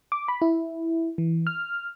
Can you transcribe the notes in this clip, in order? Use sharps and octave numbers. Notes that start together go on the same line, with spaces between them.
D6
B5
E4
E3
F6